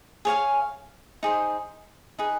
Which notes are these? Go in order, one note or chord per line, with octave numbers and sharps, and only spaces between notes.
G#4 C#5 F5 G#5
D#4 G#4 C5
D#4 G#4 B4